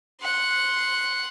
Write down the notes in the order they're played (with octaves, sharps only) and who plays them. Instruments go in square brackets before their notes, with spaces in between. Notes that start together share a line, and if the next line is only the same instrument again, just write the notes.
[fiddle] F#5 C6